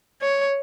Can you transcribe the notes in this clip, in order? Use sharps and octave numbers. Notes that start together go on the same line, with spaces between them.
C#5